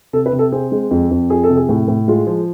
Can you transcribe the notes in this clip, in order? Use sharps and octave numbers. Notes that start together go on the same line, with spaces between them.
C3 A4
B4
C3
A4
C4 G#4
G#3
F2
F2
F3 G#4
A4
C3
G#4
A2
A2
G#3 F4
F3